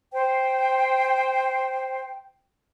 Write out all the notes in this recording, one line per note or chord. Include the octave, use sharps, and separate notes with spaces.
C5 G5